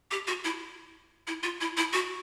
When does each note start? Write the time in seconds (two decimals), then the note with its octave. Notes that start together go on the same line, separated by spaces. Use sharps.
0.11 G4
0.27 F#4
0.44 E4
1.27 E4
1.43 F4
1.61 E4
1.77 E4
1.93 F#4